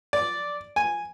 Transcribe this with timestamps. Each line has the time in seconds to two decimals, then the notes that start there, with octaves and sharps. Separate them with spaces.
0.13 D5
0.76 G#5